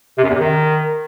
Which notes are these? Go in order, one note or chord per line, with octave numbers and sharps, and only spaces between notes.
C3
F#2
E2
C3
D#3